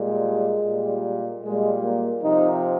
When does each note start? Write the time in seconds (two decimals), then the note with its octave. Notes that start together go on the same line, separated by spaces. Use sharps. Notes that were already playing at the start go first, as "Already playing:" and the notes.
Already playing: A#2 G3 G#3
0.65 A#2 G3
1.43 A#2 G3 G#3
1.83 A#3
2.22 C3 F3 D#4